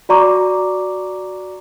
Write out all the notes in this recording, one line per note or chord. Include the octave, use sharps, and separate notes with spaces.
F#4 D5 A#5 C#6 D6